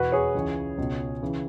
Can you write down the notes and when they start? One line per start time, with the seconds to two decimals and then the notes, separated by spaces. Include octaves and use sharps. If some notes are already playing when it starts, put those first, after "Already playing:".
Already playing: E2 B2 F#4 B4
0.12 G#4 C#5
0.35 C#2 C#3 E3
0.78 C#2 B2
1.22 C#3 E3